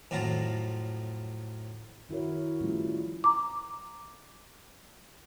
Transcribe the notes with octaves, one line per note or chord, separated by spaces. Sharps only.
F2 A2 F#3 F4 A#5
D#3 E4 F#4 A#4 C#5
F3 G3 A3 C#4 E4 F4
A#5 D6